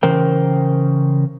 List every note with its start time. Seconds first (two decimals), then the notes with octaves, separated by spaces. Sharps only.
0.03 C#3 E3 A#4 C5 G5